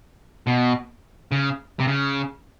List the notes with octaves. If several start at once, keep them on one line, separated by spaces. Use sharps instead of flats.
B2
C#3
C3
C#3